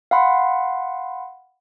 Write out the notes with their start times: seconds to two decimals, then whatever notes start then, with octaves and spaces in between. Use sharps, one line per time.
0.11 F5 F#5 B5 C6